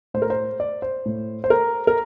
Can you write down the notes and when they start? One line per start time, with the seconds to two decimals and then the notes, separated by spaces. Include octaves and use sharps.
0.14 A2 C5
0.22 A#4
0.30 C5
0.60 D5
0.82 C5
1.06 A2
1.44 C5
1.50 A#4
1.87 A#4